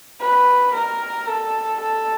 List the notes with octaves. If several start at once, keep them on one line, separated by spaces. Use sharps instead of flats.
B4
A#4
A4
A4